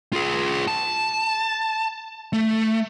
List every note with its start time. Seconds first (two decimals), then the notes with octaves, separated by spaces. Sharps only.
0.13 F4 G#4
0.68 A5
2.33 A3